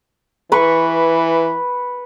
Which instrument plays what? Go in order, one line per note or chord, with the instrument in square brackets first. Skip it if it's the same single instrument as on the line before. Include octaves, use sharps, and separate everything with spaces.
[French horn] E3 [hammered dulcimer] B4 B5 C#6